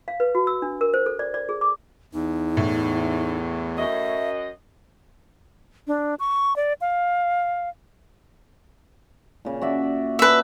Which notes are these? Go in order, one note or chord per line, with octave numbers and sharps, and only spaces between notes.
F5
B4
F#4
E6
D4
A#4
C5
A4
D5
D5
G#4
D6
E2 D#4
A2
F#2 D#5 E5
D4
C#6
D5
F5
A#2 C#3
F#4 D5 E5
C#4 D4 B4 E5